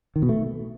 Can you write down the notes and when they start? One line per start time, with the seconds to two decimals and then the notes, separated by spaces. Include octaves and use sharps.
0.16 D#3
0.22 B2
0.29 A3